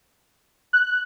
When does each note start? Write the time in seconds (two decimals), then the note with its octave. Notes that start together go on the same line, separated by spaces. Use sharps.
0.73 F#6
0.86 F#6